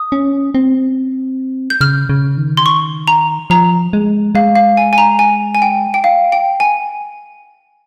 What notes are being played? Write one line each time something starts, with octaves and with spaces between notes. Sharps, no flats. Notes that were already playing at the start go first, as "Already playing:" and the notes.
Already playing: D#6
C#4
C4
G6
C#3 F6
C#3
D#3
C6
C#6
A#5
F3 A#5
G#3
G#3 F5
F5
G#5
G#5
A#5
G#5
G#5
G5
G5
F5
G5
G#5